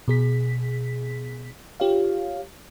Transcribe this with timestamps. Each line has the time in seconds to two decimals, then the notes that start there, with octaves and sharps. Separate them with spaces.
0.08 B2 G#4 B6
1.80 F4 G4 C#5 F5